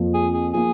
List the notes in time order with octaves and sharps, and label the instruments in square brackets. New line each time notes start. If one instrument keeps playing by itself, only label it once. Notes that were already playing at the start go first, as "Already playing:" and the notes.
Already playing: [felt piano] F2 F3 A#3
[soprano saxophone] G#4
G#4
[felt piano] F3 A#3 [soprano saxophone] G#4